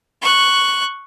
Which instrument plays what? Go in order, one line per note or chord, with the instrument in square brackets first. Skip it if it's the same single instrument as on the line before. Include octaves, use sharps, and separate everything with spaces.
[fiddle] C#6 F#6